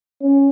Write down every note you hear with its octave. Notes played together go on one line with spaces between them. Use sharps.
C#4